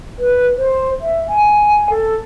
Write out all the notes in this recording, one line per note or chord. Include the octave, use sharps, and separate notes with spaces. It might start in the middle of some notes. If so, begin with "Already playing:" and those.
B4
C5
E5
G#5
A4